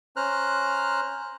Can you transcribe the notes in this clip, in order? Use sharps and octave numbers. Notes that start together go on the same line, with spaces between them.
C#4 C5 A#5 F6 F#6